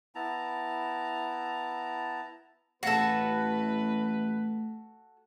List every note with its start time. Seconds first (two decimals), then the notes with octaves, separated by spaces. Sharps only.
0.15 B3 E4 A5 A#5
2.83 A1 A3 F#4 A4 B4 F5 F#5 A5